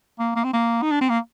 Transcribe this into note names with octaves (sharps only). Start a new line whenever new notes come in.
A#3
A#3
C4
A#3
D#4
D4
C4
A#3